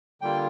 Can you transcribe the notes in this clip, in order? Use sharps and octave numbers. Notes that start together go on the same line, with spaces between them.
D3 G3 A#3 F4 G5